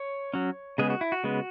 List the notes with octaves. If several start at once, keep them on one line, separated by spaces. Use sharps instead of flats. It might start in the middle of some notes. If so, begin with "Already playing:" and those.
Already playing: C#5
F#3 C#4
C#3 G#3 B3 G#4
F#4
E4
F#4
C#3 G#3 B3